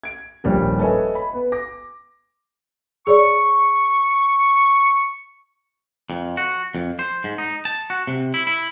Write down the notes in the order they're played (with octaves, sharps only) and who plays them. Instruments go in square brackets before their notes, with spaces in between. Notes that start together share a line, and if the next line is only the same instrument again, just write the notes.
[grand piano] G#6 D7
D#1 A#1 G3 A#4
A4 B4 C#5 D#5 E5 G#5
B5
B3
D6 A#6
[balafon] G#4 C#5 D5 [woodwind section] C#6
[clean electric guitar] F2
F#4
F2
C5
G#2
D#4
A5
F#4
C3
E4
E4